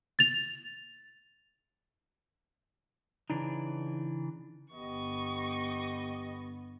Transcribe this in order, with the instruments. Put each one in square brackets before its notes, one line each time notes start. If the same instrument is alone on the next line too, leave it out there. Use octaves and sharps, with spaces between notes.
[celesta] A6 F7
[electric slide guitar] C#3 E3 D4 D#4
[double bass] G1 B3 [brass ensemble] G4 D#5 [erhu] C#6